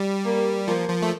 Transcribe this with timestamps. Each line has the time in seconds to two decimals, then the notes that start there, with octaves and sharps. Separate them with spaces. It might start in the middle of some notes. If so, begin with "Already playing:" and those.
Already playing: G3
0.25 A#3
0.68 F3 A#3
0.89 F3
1.02 A3